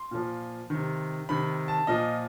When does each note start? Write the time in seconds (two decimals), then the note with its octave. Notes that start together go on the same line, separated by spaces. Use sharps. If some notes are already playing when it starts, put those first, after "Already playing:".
Already playing: C6
0.11 A#2 F3
0.70 C3 D#3
1.29 C3 D#3 B5
1.68 A5
1.87 A#2 F3 D#5